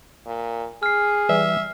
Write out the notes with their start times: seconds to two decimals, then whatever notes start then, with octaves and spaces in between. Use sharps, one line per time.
0.26 A#2
0.83 G#4 F6 C7
1.29 E3 G3 E5